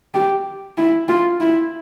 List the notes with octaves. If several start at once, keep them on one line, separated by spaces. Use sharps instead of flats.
G4
E4
F4
E4